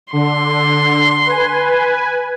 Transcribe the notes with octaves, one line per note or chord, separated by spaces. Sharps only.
D3 C6
B4 G#5